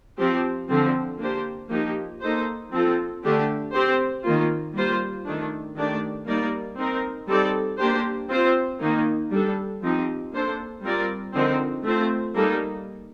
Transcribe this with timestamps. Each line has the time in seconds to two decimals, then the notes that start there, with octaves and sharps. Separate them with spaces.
0.19 F3 C4 G4
0.69 D3 F3 C4
1.20 A#3 D4 G4 C5
1.71 F3 A#3 D#4 G4
2.22 A#3 D#4 A4 C5
2.72 F3 C4 F4 A4
3.24 D3 A3 D4 G4
3.74 C4 G4 C5
4.24 D#3 A#3 F4
4.75 G3 A#3 F4 C5
5.26 D#3 A3 D4
5.76 D#3 A3 D4 G4 D5
6.27 G3 A#3 D#4 A#4 D5
6.78 C4 D#4 A#4
7.28 G3 C4 D#4 A4 D5
7.79 A#3 D4 G4 C5
8.30 C4 F4 C5
8.81 D#3 A#3 D#4
9.32 G3 D4 A4
9.82 F3 C4 D#4 G4
10.33 A#3 D4 A4 C5
10.83 G3 C4 F4 A#4 D5
11.34 D3 F3 C4 D#4 A#4
11.84 A3 C4 F4 C5
12.35 G3 A#3 D#4 A4